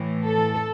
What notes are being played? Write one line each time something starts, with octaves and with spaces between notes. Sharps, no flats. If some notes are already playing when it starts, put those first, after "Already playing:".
Already playing: A2 E3
A4